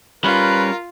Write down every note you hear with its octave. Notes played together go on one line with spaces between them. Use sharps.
G3 C#4 F4 A#4 B4